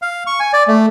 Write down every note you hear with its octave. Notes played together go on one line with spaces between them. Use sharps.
F5
C#6
G#5
D5
A3